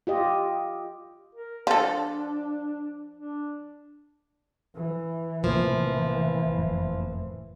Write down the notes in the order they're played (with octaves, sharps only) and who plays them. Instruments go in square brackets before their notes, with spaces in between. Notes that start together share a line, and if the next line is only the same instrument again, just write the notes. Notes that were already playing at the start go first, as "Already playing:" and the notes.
[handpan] F4 G4 D#5
[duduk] A#4
[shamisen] F3 A4 [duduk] D4
[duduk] D4
[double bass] E3
[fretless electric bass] B1 A2 C3 [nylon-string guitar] F3 A#3
[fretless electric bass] F#1 F2 A2